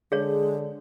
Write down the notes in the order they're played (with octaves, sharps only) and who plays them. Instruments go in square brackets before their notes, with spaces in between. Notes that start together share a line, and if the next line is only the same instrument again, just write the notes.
[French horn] D3 [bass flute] G#3 [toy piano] G#4 C#5